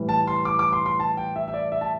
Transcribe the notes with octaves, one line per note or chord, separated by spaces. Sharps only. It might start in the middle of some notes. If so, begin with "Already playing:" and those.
Already playing: A2 E3 G3
A5
C6
D6
D6
C6
C6
A5
G5
E5
E5
D5
E5
A5